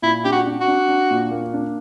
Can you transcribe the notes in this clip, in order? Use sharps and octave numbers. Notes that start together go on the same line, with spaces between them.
A#2 E4
D4 G4
F#4
D4
F#4
D4
D4
A#2
A#3
D4